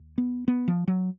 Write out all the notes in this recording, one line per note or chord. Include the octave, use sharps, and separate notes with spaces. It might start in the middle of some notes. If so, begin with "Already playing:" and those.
Already playing: D#2
B3
B3
F3
F#3